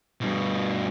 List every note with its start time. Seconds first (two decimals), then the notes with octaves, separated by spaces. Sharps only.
0.21 G2 B2